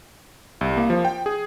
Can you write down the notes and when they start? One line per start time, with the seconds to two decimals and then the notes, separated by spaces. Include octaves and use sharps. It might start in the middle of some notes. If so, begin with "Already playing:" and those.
0.61 C2
0.77 A#3
0.90 F3
1.05 G5
1.26 G#4